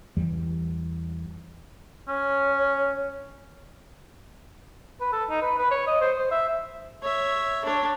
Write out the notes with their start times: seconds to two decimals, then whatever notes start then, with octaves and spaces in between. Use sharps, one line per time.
0.17 E2 E3 G3
2.08 C#4 C#5
5.01 B4
5.12 A4
5.29 D#4
5.42 B4
5.58 B4
5.71 C#5
5.87 D#5
6.01 C5
6.18 C5
6.31 E5
7.02 C#5 E5
7.65 D4 C#5